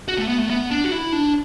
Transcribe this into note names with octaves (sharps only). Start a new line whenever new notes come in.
F#4
A3
B3
A3
B3
D4
F#4
E4
D4